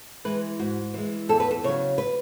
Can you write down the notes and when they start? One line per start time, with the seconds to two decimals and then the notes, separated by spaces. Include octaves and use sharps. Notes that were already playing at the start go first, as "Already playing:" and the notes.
0.25 E3 G#3 B4
0.59 G#2 F#4
0.94 E3 G#3
1.29 E2 A4
1.40 B4
1.51 A4
1.64 C#3 F#3 C#5
1.98 B4